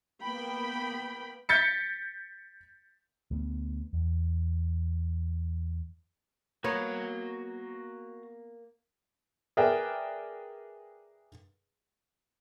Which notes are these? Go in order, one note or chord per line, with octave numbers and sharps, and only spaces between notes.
A#3 B3 G5 B5
G6 A6 B6 C#7
D2 G3 B3
E2
A#3 B3 F#4 C#5 A#5
G#4 A#4 B4 D5 E5 G5